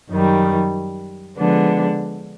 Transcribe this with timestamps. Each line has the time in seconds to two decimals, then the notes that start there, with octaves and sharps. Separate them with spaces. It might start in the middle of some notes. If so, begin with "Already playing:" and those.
0.10 F#2 D#3 G3
1.38 D3 F3 G#3 B3 D4